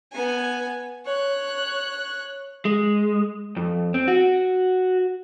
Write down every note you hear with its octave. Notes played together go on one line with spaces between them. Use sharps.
B3 G#5
C#5 F#6
G#3
F2
C4
F#4